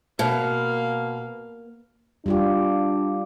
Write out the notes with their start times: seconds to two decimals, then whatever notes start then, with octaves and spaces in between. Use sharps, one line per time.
0.19 B2 A#3 F5
2.26 G3 D4 F4 G4